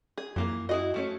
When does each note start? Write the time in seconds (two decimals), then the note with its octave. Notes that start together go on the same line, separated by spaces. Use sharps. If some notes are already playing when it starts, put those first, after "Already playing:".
0.18 G#4
0.36 F#2 E3 A#3 F4
0.69 E4 F#4 G#4 D#5
0.94 F3 A3 C#4